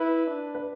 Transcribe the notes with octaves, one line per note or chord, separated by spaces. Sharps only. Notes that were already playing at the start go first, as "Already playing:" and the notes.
Already playing: E4 B4
D4
B4